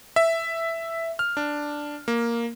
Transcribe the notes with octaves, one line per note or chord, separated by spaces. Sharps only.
E5
F6
D4
A#3